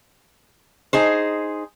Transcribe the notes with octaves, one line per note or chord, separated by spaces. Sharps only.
D#4 G#4 C5